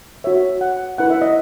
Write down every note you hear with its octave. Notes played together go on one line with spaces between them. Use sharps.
F#4 C#5 E5
F#5
E4 B4 F#5
E5
D#5